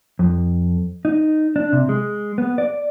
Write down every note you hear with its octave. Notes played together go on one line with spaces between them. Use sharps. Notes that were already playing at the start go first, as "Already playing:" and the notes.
F2
D#4
D4
C3
G#3
B3
D5